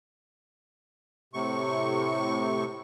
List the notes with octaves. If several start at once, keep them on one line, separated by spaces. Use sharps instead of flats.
A2 C3 C#6